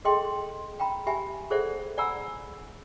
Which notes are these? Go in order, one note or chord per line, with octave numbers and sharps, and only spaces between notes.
G#4 A4 D#5 G5 C6
G5 A#5 B5
G4 E5 G#5 B5
G#4 A4 C5 D5 E5 F#5
D5 F#5 G#5 A#5 B5 E6